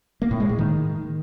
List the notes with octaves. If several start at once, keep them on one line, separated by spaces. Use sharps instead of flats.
A#3
A2
G#3
A2
D#3